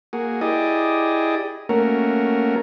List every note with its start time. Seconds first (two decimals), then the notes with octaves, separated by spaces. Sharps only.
0.13 A#3 F#4 G#4
0.41 E4 G4 G#4 D5 D#5
1.69 A3 A#3 C#4 F#4 A#4